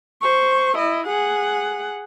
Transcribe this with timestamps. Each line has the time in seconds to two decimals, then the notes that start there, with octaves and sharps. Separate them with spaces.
0.21 C5 C#6
0.77 E4 D#5
1.07 G#4 F#5